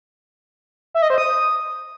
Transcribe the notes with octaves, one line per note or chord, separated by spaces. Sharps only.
E5
D#5
C5
D#6